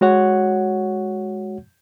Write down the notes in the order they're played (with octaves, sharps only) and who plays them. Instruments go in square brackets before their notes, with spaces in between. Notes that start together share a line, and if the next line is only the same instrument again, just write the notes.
[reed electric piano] G#3 F#4 C#5 F#5